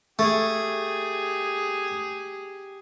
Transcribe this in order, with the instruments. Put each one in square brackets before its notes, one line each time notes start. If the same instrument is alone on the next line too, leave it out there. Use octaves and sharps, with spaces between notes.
[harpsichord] A3 [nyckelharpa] G4 G#4